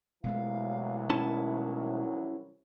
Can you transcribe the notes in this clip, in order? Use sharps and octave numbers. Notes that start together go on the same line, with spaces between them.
C2 B2 E3 F#3 G#3 A3 F5
D#3 C#4 E4 A5